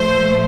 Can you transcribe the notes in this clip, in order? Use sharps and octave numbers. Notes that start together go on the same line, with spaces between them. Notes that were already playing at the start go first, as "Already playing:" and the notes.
Already playing: A#2 F3 A3 C5